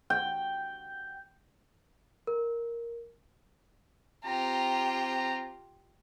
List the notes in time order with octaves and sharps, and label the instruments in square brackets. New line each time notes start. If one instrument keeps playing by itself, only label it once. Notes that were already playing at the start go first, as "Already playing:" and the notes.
[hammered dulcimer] G5
[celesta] A#4
[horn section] C4 G5 A#5 [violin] F4 G4